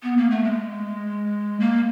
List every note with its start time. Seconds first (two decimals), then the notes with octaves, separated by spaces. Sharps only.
0.03 B3
0.17 A#3
0.30 A3
0.44 G#3
1.60 A#3